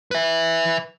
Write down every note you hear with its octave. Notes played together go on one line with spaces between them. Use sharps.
B4 E5